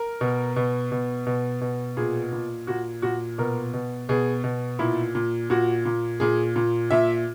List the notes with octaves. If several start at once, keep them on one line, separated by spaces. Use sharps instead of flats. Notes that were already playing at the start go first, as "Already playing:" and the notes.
Already playing: A#4
B2
B2
B2
B2
B2
A#2 G#4
A#2
A#2 F#4
A#2 F#4
B2 A#4
B2
B2 G#4
B2
A#2 E4
A#2
A#2 F#4
A#2
A#2 G#4
A#2
A#2 E5